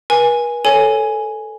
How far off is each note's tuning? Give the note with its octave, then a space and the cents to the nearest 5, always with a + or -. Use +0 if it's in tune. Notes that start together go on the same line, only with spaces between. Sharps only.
B4 -45 G#5 -5
A4 +0 C#5 +0 G#5 +0